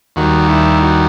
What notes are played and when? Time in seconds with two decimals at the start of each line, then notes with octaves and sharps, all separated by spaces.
0.16 D#2 D#3 G3 F#4
0.49 E4
0.83 F#4